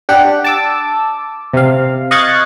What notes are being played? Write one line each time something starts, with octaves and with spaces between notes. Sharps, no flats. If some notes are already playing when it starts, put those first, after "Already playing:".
D4 G4 F#5
A5 D6 E6
C3 F5
D#5 F5 C#6 F#6 G#6 A6